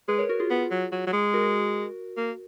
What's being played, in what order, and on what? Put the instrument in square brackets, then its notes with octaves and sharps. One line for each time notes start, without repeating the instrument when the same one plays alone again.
[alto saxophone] G#3 [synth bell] G#4 B4
[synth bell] A#4 C#5
F#4 A#4
F4 G#4
[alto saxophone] B3
F#3
F#3
F#3
G#3
[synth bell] F#4 A#4
[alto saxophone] A#3